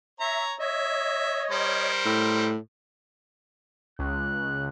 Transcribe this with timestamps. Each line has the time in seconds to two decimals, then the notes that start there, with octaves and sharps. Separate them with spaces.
0.20 C#5 E5 A#5
0.59 C#5 D#5 E5
1.51 G3 A#4 C5
2.06 A2
3.99 C#2 F#6